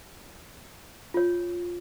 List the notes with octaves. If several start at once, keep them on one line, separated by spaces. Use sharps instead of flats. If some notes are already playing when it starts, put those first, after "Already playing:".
F4 C#5